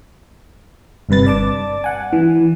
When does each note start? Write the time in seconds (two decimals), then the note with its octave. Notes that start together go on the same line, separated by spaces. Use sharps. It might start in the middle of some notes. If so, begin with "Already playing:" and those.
1.09 G1 G2 C3 B4 A6
1.26 D5 A5 D6
1.84 F#5 G#5
2.13 E3